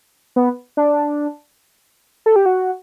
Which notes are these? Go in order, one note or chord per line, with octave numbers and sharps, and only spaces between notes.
B3
D4
A4
G4
F#4